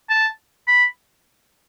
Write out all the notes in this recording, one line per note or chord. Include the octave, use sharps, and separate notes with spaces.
A5
B5